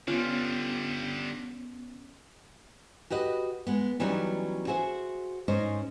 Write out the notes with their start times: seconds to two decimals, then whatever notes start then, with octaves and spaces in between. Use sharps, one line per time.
0.08 D3 G3 B3 C#4 F4
3.10 F#4 G4 B4 D#5
3.67 G#3 B3
4.00 E3 F#3 G3 B3 C#4 D#4
4.67 F#4 G#4 C5 E5
5.48 G#2 C#4 C5 D#5